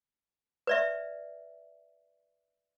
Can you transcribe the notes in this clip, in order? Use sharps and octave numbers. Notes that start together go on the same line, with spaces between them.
B4 D5 E5